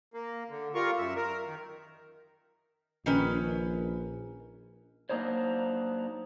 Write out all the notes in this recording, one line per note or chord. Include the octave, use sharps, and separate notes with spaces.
A#3
D3
G3 F4 A#4 C#6
F#2 E5
A#4
D#3
A#1 D#3 C#4 B4
F#3 A#3 D4 D#4 C5 C#5